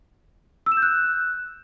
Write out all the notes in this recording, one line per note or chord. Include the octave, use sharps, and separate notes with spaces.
E6
E7
G6
F#6